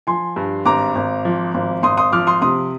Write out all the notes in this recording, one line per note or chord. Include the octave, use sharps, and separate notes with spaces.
F3 G#5 C6
G2
G#1 A#5 D6
G#1
F3
G#1
G#1 C6 D#6
C6 D#6
F3 D6 F6
C6 D#6
C3 C6 D#6